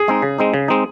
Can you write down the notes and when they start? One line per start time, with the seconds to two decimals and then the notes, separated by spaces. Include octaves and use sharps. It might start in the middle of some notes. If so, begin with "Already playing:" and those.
Already playing: G#4
0.08 G#3 C4 D#4
0.22 C#3
0.38 G#3 C4 D#4
0.54 C#3
0.68 G#3 C4 D#4